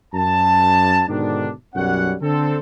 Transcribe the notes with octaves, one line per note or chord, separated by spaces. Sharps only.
F#2 A5
G#2 B2 D3 D#3 D4
B1 F#2 G3 C#4 C#5 F#5
D3 C4 A4